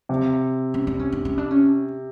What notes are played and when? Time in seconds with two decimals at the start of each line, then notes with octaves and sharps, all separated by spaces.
0.09 C3
0.74 C#4
0.87 D4
0.99 C#4
1.12 D4
1.25 C#4
1.38 D4
1.51 C#4